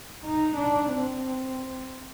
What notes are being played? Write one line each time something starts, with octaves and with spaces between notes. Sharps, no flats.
D#4
D4
C4